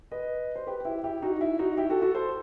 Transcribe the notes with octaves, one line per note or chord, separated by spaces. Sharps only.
B4 D#5
C5
G4 B4
E4 G4
E4 G4
D#4 F#4
E4
D#4 F#4
E4 G4
F#4 A4
F#4 A4
A4 C5